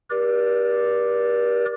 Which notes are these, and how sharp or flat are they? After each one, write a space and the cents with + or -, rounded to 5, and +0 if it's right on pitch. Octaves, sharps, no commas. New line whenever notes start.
G4 +0 A#4 +45 D5 +0